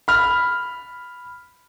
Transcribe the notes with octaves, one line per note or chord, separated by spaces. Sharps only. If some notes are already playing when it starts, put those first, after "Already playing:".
B5 F6